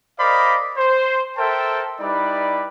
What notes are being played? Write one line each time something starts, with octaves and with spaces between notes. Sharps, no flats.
A#4 C5 D5 D#5 F5 B5
C5
A4 A#4 C5 E5 G5 A5
G3 D#4 E4 B4 D5